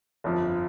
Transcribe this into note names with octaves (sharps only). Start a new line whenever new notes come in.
G1 F2 F3